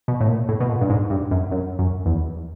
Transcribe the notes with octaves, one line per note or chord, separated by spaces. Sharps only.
B2
A2
A#2
A2
B2
A#2
G2
G#2
G2
F#2
F#2
F#2
E2